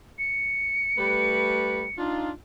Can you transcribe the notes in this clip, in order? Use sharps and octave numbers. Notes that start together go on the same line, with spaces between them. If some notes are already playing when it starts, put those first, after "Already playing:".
C#7
G3 A3 B4
D4 D#4 F4